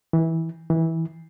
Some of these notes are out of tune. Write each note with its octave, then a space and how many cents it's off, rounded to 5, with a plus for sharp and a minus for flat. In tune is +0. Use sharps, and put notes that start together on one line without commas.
E3 -20
E3 -20